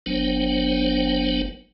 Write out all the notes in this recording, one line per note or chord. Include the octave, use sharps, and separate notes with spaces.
F#1 F#3 B3 D4 C5 G5